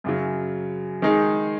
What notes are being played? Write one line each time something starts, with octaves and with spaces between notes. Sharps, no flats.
F#2 C#3 F#3
D#3 G#3 D#4 G#4